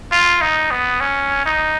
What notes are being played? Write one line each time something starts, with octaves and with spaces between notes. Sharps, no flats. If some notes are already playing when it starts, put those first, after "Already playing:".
F4
D#4
B3
C#4
D#4